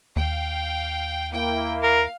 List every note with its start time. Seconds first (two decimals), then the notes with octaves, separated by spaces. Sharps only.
0.16 D#2 F5 G5
1.33 A#3 E4 G5
1.83 A#4 F5